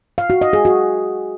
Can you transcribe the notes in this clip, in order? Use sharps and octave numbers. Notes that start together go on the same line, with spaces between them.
F5
F#4
D#5
G#4
F#4